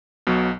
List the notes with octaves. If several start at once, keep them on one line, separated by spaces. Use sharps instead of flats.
B1 B2 F#3